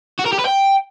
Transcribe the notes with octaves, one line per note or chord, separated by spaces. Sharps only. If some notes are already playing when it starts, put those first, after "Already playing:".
F#4
A#4
G4
B4
G5